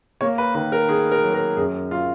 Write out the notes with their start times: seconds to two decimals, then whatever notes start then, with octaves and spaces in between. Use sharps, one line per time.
0.21 A#3 C#5
0.38 B4
0.55 D#3 B4
0.72 A#4
0.88 D#3 G#4
1.11 A#4
1.23 F#3
1.34 A#4
1.57 F#2 G#4
1.91 F#3 F4